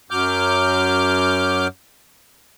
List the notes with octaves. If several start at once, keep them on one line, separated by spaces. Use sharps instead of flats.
F#2 F#3 D6 F6 G6